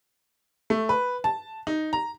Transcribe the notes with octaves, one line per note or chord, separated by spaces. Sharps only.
A3
B4
A5
D#4
A#5